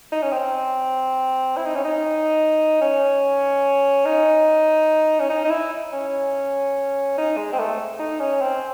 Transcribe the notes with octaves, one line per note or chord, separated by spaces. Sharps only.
D#4
C#4
C4
E4
D#4
C#4
D#4
C#4
D#4
C#4
D#4
D#4
E4
C#4
D#4
G#3
C4
A3
D#4
C#4
C4